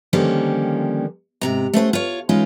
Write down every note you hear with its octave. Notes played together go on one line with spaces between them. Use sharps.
D3 D#3 F3 G3 A#3 C#4
G#2 C3 A#5
A3 C#4 C5 F#5
F4 C#5
E3 G#3 C#4 D#4 F4